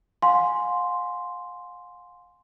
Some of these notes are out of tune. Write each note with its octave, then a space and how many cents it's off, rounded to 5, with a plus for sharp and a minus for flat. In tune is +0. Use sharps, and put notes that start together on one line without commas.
F5 +35 G#5 +0 C6 +0